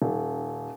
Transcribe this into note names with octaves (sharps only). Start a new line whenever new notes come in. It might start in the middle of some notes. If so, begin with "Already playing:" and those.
D#1